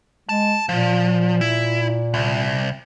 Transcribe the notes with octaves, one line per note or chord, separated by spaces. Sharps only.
G#3 A5
A#2 F3
E4
C2